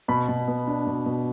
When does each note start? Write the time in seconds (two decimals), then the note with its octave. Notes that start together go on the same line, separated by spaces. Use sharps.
0.08 B2 B5
0.28 B2
0.48 B3
0.67 D4
0.86 B2
1.06 B2